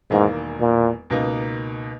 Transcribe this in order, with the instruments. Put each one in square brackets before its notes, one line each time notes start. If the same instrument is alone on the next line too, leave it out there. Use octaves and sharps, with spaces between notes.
[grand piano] E1 E2 D#3 A#3 [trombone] G#2
[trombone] A#2
[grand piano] C#2 B2 A#3 D#4